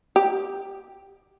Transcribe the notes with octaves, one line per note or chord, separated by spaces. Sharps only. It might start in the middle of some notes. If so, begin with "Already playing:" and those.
G4